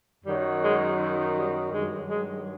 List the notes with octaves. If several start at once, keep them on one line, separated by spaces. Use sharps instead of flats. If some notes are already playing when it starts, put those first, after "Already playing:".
F#2 D#3 F#3 G3
G#3
F#3
G3
G2 D#3 F#3 G#3
G#3